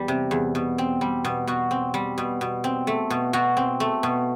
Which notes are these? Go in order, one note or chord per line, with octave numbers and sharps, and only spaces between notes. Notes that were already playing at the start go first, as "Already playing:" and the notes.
Already playing: E2 G3
C3
E2
B2
C4
G3
B2
B2 F#4
C4
G3
B2
B2
C4
A3
B2
B2 F#4
C4
A3
B2